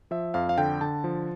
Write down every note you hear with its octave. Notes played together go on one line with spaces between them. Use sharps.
F3 E5
F2 F5
F5
D3 G5
D3 A5
F3